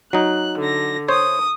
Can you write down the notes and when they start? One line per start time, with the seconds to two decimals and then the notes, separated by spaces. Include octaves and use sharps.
0.13 F#3 D#4 F#6
0.59 D3 A#6
1.08 C5 C#5 D#6